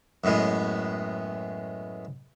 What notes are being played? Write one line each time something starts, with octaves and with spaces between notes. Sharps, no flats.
F#2 A2 G#3 B3